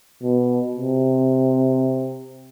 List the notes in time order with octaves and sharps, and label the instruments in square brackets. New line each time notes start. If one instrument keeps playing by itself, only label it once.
[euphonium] B2
C3